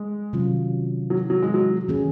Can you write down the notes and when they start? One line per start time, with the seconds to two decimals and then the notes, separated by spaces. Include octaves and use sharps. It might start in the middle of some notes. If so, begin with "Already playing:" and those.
Already playing: G#3
0.33 C3 D#3 F#3 C#4 F4
1.10 F#3
1.30 F#3
1.42 G#3
1.54 F#3
1.88 D#3 A#3 C#4 G#4